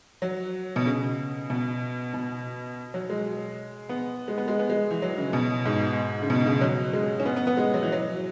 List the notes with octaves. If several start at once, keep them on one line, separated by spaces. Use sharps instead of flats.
F#3
B2
C#3
B2
B2
F#3
G#3
B3
G#3
B3
G#3
B3
G#3
E3
F#3
C#3
B2
G#2
C#3
B2
C#3
F#3
G#3
C#4
B3
B3
B3
G#3
F#3
E3
F#3